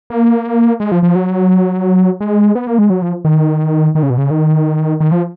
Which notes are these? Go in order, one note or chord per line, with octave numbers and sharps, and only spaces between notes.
A#3
G#3
F3
F3
F#3
G#3
B3
A#3
G#3
F#3
F3
D#3
D#3
C#3
B2
C#3
D#3
D#3
F3